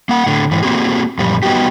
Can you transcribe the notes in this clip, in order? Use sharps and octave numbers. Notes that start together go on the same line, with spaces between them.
A#3 F#5
A2 D3
G#2 E3
A#3 C4 F#4 G#4
F#2 A#2 F3 G3
G3 B3 D#4 F#4 G4